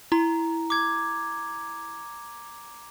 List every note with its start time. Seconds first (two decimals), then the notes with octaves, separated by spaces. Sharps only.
0.12 E4 A#5
0.70 D6 G#6